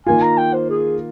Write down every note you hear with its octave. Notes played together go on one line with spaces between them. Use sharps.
D#3 A#3 F4 G#5
A#5
G5
C5
G#4